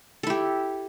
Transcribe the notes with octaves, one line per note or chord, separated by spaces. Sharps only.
E4 G4 A4